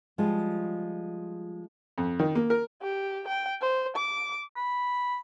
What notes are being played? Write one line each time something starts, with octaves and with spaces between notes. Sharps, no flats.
F3 G3 G#3 F4
F2
D#3
A#3
A#4
G4
G5
C5
D6
B5